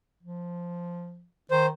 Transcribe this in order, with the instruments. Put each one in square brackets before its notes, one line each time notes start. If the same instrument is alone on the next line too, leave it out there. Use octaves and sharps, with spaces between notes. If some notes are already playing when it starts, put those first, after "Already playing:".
[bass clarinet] F3
[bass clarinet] D#3 [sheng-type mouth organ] C5